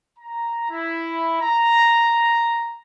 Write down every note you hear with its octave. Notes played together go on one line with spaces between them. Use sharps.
A#5
E4
A#5